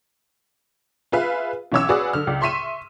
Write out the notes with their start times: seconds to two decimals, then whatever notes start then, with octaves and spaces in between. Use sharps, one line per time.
1.12 F4 G#4 B4 E5 F5
1.72 B1 E3 C#4 C#5 D6 E6
1.89 F#4 G#4 B4 D5 F#5 D#6
2.13 D3 F6
2.27 C#2 D5
2.41 E5 C6 C#6 B6 D#7 E7